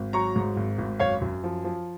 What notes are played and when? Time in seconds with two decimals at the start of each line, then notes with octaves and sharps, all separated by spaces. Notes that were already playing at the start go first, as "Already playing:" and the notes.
Already playing: G#1
0.13 F#3 A#5 C#6
0.36 G#2
0.57 G#1
0.78 G#1
1.00 F#2 C#5 F5
1.22 F#2
1.44 F3
1.65 F3